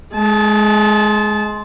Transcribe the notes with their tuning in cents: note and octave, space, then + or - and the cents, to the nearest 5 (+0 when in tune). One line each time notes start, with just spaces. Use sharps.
G#3 +20 A5 -25